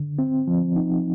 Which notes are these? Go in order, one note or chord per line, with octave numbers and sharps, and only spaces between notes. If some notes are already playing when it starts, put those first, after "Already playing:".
Already playing: D3
C4
F3
D#4